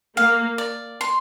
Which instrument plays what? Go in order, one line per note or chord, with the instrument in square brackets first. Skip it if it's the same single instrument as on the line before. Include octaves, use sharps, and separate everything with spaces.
[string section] A#3 [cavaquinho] F5
[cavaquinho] D5
C6